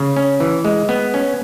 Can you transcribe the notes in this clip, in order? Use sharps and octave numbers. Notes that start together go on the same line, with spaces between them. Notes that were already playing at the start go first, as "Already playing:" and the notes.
Already playing: C#3
C#4
E3
G#3
B3
C#4